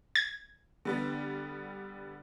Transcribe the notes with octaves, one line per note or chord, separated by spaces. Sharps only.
G#6
D3 G3 B3